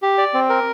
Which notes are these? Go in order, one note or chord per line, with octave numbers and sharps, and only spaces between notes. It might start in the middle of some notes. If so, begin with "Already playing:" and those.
G4
D5
C4
A#4